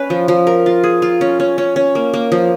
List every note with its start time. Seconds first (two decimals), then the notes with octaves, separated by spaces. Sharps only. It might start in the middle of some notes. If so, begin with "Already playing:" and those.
Already playing: C#4 B4
0.10 F3
0.28 F3
0.47 A#4
0.66 F4
0.83 G#4
1.02 F4
1.21 C#4
1.40 C#4
1.58 C#4
1.76 C#4
1.95 A#3
2.14 A#3
2.32 F3